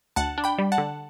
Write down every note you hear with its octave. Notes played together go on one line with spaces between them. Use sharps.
D2 F#5 A5
D4
G5 B5
G3
F#5 A5
D3